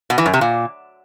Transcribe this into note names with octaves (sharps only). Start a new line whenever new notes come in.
B2
E3
F#2
C3
A#2